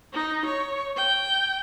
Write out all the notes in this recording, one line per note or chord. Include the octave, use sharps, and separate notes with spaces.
D#4
C#5
G5